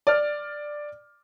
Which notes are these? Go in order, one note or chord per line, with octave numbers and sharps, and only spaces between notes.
D5 F6